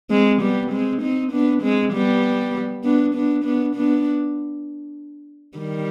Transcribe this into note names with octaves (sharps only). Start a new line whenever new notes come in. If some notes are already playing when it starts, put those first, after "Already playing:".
G#3 C4
G3 B3
G#3 C4
C4 D#4
B3 D4
G#3 C4
G3 B3
B3 D4
B3 D4
B3 D4
B3 D4
D#3 G3